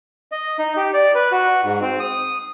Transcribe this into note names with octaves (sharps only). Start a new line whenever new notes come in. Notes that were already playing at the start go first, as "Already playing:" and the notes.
D#5
D#4
G4
D5
B4
F#4
G#2
C4
D#6